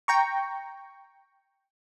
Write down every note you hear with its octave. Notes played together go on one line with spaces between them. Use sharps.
G5 A#5 C#6